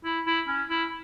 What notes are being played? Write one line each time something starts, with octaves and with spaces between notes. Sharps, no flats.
E4
E4
C#4
E4